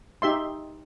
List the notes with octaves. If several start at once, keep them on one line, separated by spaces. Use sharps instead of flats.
D#4 G4 E5 C6